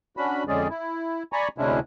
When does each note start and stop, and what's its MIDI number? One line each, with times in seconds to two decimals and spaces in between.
0.17 0.44 61
0.17 0.44 62
0.17 0.44 66
0.17 0.44 83
0.48 0.68 41
0.48 0.68 50
0.48 0.68 56
0.48 0.68 61
0.48 0.68 68
0.48 0.68 74
0.70 1.23 64
1.33 1.48 74
1.33 1.48 80
1.33 1.48 82
1.33 1.48 83
1.33 1.48 85
1.58 1.80 38
1.58 1.80 48
1.58 1.80 56
1.58 1.80 61
1.58 1.80 62
1.58 1.80 64